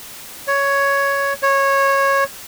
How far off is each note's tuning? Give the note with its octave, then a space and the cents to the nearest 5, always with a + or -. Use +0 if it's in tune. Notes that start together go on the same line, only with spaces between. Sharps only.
C#5 +5
C#5 -15